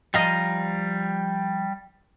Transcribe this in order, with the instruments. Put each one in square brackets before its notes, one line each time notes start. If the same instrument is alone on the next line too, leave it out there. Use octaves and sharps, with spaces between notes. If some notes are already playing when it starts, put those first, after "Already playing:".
[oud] F3 D#5 [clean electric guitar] G3 F5 A#5